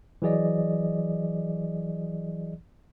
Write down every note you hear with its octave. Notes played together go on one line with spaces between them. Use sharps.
E3 F#3 G#4 D5 D#5